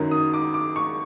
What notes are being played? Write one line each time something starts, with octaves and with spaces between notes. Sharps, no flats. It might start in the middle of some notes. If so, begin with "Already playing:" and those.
Already playing: F#2 D#3 F#3
D#6
D6
D6
C#6